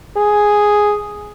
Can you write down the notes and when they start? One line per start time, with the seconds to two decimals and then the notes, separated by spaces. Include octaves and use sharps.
0.17 G#4